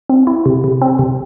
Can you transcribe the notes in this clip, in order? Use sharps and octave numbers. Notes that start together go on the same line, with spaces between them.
C4
E4
C3
C3
C4
C3